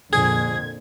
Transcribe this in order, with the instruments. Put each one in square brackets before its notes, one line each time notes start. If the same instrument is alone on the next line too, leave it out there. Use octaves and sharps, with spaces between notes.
[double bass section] F2 A#2 D3 [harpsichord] G#4 [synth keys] G#6